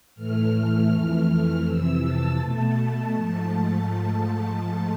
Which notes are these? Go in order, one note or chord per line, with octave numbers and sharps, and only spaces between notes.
A2 E3 A3 F6
F2 E3 A3
F2 C3 E3 E6
A5
B2 A3
G#2 F3 A3